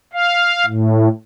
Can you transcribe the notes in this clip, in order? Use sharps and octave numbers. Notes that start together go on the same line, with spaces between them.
F5
A2